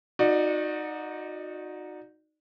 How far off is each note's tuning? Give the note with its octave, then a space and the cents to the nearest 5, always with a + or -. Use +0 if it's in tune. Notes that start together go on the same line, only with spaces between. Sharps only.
D#4 +0 F#4 -25 D5 +20